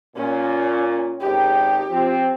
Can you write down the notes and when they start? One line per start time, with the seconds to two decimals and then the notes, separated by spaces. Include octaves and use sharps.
0.16 A#2 C#4
1.20 G#1 D#4 G4 G5
1.90 F3 C4